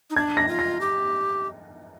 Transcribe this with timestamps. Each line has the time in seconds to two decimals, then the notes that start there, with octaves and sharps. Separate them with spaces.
0.10 D#4
0.16 D4 G#6
0.37 A#6
0.48 F4
0.59 A#6
0.81 G4